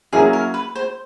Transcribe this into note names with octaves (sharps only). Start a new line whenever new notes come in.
F#3 A#3 C#4 E4 G#4
A#4
B4
C5